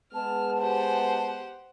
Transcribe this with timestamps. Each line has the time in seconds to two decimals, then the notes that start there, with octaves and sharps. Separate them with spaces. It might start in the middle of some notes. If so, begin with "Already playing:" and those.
0.14 G#3 B3 A5 F6
0.60 G4 C5 F#5